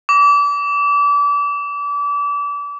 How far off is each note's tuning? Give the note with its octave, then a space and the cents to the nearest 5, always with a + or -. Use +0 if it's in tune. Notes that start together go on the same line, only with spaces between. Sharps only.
D6 -30